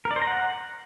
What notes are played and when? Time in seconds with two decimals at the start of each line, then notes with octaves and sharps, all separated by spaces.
0.05 A#4
0.11 D5
0.16 C5
0.22 A#5
0.27 F#5